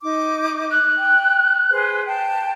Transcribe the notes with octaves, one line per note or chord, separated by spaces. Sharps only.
D#4 D6
F#6
G5
G#4 B4 C5
G5 A5